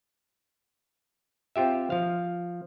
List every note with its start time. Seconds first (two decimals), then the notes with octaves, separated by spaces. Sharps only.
1.56 C4 F4 G4 E5
1.90 F3 F5